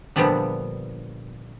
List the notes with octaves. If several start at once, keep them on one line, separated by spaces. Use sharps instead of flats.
A#2 D3 F3 G3 B3 D4